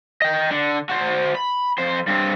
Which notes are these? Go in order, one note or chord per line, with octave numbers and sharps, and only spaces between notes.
D#5 G5
D3
F#4 C5
B5
F2 C5
G2 C4